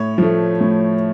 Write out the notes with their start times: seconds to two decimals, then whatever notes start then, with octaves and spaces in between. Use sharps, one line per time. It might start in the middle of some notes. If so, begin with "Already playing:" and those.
Already playing: A2 C#5
0.18 F3 A3
0.61 A2